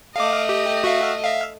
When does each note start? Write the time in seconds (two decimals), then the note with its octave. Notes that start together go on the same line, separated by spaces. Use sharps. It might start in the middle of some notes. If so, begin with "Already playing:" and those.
0.16 A3 D#5 F5 D6
0.49 G4
0.84 F#4 E5 F5
1.24 E5 F5